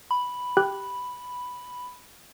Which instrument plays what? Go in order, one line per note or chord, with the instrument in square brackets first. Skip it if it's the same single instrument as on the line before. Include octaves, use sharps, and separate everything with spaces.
[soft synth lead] B5
[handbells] G4 G5 F#6